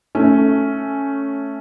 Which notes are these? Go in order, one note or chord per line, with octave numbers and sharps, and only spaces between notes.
A3 C#4